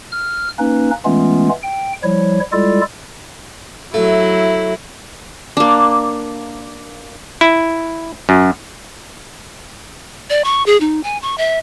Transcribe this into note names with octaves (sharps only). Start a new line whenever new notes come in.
F6
A#3 C#4 D#4 B4
E3 G#3 A3 B3 C#4 F4
G5
F3 G3 E4 C#5
G3 G#3 E4 F4 A4 D5
F#3 A3 E4
A#3 D4
E4
F#2
D5
C#6
G#4
D#4
G#5
C#6
E5